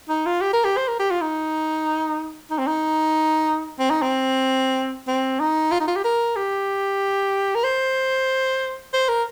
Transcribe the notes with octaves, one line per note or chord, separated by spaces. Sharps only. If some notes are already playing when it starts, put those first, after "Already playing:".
D#4
F4
G4
A#4
G4
C5
A#4
G4
F4
D#4
D#4
C4
D#4
C4
D#4
C4
C4
D#4
F4
D#4
F4
G4
A#4
G4
A#4
C5
C5
A#4